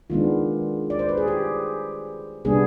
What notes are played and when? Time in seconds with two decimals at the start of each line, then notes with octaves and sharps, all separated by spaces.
0.10 D#3 G#3 B3 D4 F4
0.90 D5
0.99 C5
1.09 B4
1.18 G#4
1.28 G4
2.45 C3 G3 B3 D4 G#4